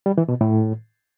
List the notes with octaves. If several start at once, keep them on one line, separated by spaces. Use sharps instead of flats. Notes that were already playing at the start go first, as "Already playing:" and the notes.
G3
E3
B2
A2